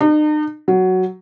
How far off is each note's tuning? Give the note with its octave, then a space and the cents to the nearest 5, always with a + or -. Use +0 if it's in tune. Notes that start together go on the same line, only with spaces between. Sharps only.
D#4 -45
F#3 +5